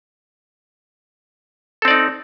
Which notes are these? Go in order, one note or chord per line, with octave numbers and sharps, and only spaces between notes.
C4 D#4 A4 D5